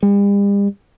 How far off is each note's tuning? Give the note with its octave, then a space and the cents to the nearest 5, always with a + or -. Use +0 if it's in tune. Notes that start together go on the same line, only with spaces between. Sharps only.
G3 +45